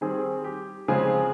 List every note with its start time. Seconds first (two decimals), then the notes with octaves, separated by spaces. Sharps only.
0.01 D#3 G3 C4 G#4
0.44 G4
0.88 C#3 F3 G#3 C4 G#4